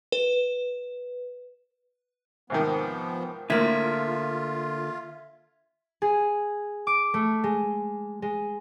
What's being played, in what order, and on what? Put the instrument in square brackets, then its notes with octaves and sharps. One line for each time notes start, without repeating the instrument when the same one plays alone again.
[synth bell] B4
[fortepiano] G#2 C3 D#3 [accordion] F3 B3
[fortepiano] A2 [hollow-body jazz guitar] D3 A#3 [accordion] F4 [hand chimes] E5 G#6 B6
[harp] G#4
D6
A3
G#3
G#3